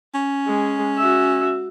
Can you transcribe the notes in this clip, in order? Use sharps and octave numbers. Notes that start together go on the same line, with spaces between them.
C#4
G#3
F#4 E5